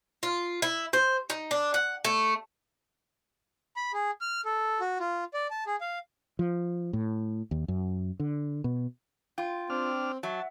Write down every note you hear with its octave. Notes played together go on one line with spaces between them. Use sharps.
F4
E4
C5
D#4
D4
F#5
A3
B5
G#4
F6
A4
F#4
F4
D5
A5
G#4
F5
F3
A2
D#2
F#2
D3
B2
F4 G5
C4 D4 F6
F#3 E5 F#5 A5